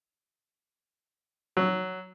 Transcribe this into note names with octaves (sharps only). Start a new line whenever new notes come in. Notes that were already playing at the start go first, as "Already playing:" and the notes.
F#3